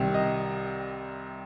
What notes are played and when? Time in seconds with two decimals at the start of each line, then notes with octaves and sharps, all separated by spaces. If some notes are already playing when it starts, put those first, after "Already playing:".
Already playing: C2 C3 D#3 G3
0.14 D#5